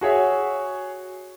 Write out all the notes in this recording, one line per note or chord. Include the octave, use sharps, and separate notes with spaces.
F#4 G#4 C#5 E5